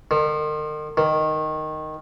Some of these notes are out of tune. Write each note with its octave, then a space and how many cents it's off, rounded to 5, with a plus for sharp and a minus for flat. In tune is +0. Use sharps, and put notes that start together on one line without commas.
D#3 -40
D#3 -5